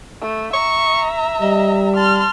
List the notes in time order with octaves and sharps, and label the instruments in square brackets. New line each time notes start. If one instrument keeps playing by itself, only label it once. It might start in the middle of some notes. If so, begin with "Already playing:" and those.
[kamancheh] A3
[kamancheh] E5 A#5 [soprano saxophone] C#6
[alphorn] G3 [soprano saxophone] D#5
[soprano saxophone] A5 [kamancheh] C6 F6